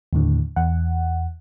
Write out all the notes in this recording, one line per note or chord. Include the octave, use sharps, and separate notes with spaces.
D#2 A2 D3
E2 F#5